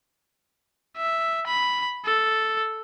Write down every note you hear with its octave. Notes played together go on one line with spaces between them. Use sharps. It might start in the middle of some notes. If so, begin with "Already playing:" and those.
E5
B5
A4